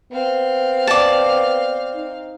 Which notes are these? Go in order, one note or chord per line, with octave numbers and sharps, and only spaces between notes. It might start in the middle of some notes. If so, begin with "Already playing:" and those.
B3 C4 F5
D5 A5
D#4